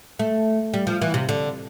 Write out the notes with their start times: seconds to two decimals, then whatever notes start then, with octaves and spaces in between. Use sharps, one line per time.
0.19 A3
0.74 G3
0.87 F3
1.02 E3
1.14 C3
1.29 D3